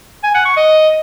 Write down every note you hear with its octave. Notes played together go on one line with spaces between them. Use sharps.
G#5
F#5
C#6
D#5